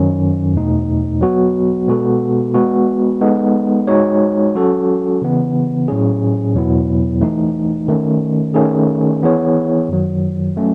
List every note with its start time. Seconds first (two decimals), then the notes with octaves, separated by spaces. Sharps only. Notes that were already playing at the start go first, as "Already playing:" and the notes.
Already playing: F#2 D#3 F#3 C#4
0.54 E2 B2 A3 D#4
1.21 F#3 B3 F#4
1.88 B2 G#3 B3 F#4 A4
2.54 G#3 B3 F#4
3.21 G#3 B3 D#4 A4
3.87 G#3 D#4 F#4 C#5
4.55 F#3 C#4 F#4 A4
5.22 C#3 E3 B3
5.88 A2 F#3 C#4 G#4
6.55 E2 B2 F#3 B3 E4
7.21 E3 A3 D#4
7.88 D#3 A3 C#4
8.54 D#3 A3 C#4 G#4
9.22 E3 B3 E4 G#4 C#5
9.88 F#2 D#3 F#3
10.56 F#3 A3 C#4